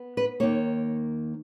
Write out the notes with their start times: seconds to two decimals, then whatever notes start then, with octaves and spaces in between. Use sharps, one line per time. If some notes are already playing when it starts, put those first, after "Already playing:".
Already playing: B3
0.17 B4
0.40 D#2 D#3 A#3 C#5